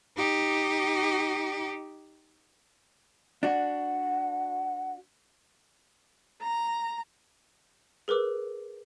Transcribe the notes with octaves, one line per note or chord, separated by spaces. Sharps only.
D#4 G4
D4 F#4 F#5
A#5
G#4 A#4 B4 D6 E6